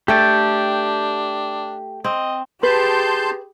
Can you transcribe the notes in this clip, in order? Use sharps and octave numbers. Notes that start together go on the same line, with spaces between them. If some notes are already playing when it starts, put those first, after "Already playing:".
A3 D4 G4 A4 G5
C4 D#5
G4 G#4 B4 A5 C6 G6